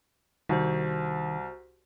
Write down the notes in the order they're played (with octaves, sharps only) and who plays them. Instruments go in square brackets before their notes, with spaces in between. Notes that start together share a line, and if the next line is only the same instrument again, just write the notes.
[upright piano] C2 [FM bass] D#3 [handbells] F#4 C5